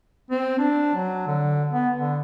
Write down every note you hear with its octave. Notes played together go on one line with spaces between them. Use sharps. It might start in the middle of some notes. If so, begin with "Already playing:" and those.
C4
D4
F#3
D3
B3
D3